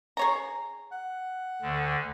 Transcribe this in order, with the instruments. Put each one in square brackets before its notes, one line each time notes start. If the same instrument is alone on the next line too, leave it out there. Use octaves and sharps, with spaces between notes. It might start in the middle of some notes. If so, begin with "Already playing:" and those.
[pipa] G#4 C#5 A#5
[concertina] F#5
[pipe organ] D2 D3